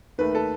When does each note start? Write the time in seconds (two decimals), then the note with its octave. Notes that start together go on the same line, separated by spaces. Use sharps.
0.18 D#2 D#3 A3 B4
0.35 A4